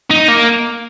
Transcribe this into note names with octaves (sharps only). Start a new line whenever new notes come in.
D#4
A#3